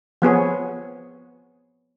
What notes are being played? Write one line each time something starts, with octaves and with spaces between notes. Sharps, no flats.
F3 B3 G#4 C#5